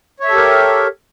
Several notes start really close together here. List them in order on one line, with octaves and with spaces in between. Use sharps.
C#5 E5 A4 G4 A#4